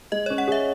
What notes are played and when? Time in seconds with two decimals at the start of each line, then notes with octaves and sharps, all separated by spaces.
0.12 G#3 D#5
0.26 C#4 C#5
0.38 F#5
0.48 G#4 E5